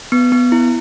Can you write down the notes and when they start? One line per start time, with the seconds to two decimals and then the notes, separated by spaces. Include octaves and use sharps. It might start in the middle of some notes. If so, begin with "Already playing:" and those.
0.12 B3
0.32 B3
0.52 E4